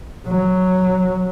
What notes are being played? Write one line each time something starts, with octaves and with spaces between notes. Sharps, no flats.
F#3